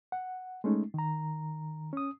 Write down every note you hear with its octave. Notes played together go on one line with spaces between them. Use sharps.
F#5
G#3 A3 C#4 D#4
D#3 A#5
C#4 D#6